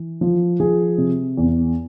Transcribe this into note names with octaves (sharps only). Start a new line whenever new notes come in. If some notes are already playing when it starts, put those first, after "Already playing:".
Already playing: E3
F3
F3 G#4
C3
E2